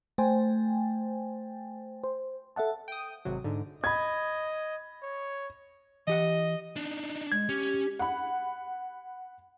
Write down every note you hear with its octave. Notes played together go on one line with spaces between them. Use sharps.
A3 C5 G5 G#5
C5
A4 E5 F#5 A5
G5 D#6
G#1 C3 F#3
G#2 D3
D#5 B5 G#6
C#5
E3 G4 D#5 F#5
D4 D#4
G#3 G#6
C#4 G4
F#5 B5